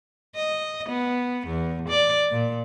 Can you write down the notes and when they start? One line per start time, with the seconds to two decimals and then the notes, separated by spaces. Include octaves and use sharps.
0.35 D#5
0.89 B3
1.47 E2
1.88 D5
2.31 A#2